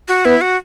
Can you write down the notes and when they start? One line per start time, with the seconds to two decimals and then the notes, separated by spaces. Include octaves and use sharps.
0.08 F#4
0.25 B3 E4
0.41 F#4